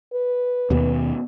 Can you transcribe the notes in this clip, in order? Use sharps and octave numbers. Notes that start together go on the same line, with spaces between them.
B4
D#2 B2 D#3 B3